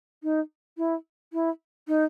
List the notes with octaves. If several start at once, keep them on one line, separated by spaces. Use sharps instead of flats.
D#4
E4
E4
D#4